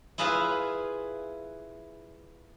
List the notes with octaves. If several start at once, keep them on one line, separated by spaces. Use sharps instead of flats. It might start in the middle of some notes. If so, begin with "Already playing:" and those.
E4 F4 G#4 B4 E5 F5